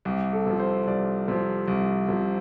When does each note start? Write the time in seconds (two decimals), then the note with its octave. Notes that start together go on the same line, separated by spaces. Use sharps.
0.05 C2 G4
0.33 A4
0.46 C3 F3
0.59 C5
0.87 C2 D5
1.28 C3 F3
1.68 C2
2.08 C3 F3